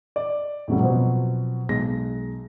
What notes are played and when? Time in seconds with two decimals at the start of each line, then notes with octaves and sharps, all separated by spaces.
0.16 D5
0.68 F2 A2 C#3 F#3 G3
0.80 B2 F3 F#3 C4
1.69 B1 G#3 A#6